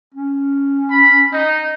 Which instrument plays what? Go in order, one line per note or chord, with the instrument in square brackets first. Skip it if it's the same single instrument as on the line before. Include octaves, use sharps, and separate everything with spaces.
[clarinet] C#4
[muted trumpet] B5
[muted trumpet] D#4 [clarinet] D#5